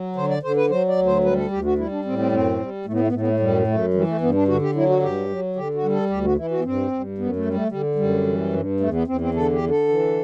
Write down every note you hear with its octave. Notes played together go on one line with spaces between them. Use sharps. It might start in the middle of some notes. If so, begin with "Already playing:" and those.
Already playing: F#3
D3 C5
D5
D3 C5
B4
F#3 C5
D5
D2
C5
G3 B4
A4
D2 G4
F#4
G3 E4
D4
A2 C4
C4
F#2 C4
G3
A2 A3
B3
A3
B3
A2 A3
B3
A3
F#2 G3
F#2 A3
E3 G3
A3
G2 B3
D4
D3 F#4
G4
F#3 E4
F#4
G2 G4
F#3
D3 G4
F#4
G3
A4
D2 G4
F#4
E3 E4
F#4
B3
G2 C4
G2
F#2 B3
A3
G3
A3
D3 G3
F#2 G3
E3
G2
E2 A3
B3
E2 C4
C4
D3 A4
G4
D3
A4
E3